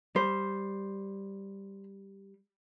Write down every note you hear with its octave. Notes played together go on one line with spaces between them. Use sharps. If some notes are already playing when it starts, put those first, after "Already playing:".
G3 C5